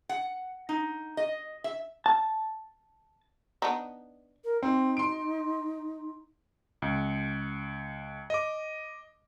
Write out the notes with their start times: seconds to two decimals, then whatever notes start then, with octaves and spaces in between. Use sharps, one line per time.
0.09 F#5
0.69 D#4
1.17 D#5
1.64 E5
2.06 A5
3.62 B3 D4 D#4
4.44 A#4
4.63 C4 D#4
4.97 C6 D7
6.82 C#2
8.30 D#5 D6